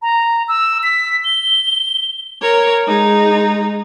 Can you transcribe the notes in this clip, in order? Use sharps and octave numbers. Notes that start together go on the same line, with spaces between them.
A#5
E6
B6
G7
A#4 C#5
G#3 D#4